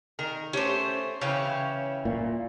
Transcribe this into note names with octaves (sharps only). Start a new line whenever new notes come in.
D#3 A#4
A3 C#4 G4 C5 C#5
C#3 E3 C#4 E4 G4 C#5 F5
A#2